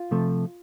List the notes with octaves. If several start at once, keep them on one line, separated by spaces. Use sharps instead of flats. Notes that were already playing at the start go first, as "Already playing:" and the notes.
Already playing: F4
C3 F3 A3